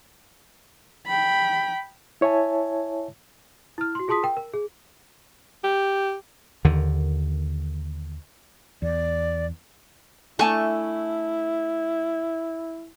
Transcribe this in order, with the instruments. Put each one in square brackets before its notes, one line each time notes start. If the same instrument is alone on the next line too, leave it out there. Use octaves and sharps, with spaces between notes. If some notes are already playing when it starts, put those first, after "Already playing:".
[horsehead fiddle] G5 B5
[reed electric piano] E4 C#5 E5 G#5 A5
[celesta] E4 F6
F#4 C6
F4 G#4 A5 C6 D#6 B6
A#4 G5
A#4
G#4
[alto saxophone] G4
[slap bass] D#2 D3 D#3
[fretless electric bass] E2 [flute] D5
[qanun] A3 C#6 [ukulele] D4 G#5 A5 [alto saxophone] E4